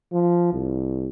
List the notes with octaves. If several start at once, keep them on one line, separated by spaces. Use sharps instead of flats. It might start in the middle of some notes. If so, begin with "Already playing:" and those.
F3
C2